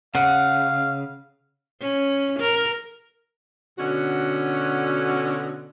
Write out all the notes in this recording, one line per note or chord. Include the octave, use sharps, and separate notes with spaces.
C#3 F5 F#5
C#4
A#4
B2 D3 C#4 F#4